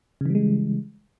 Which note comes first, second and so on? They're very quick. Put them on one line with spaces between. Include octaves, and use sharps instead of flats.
C#3 E3 G3 G#3